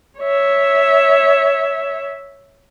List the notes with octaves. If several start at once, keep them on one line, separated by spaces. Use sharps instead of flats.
C#5 E5